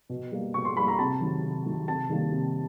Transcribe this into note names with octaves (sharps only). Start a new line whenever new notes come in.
B2
G3 A#3
B2 C#6
C6
G3 A#3 B5
A#5
C3 A5
D#3 F#3 A3
C3
D#3 F#3 A3
C3 A5
D#3 G3 A#3
C3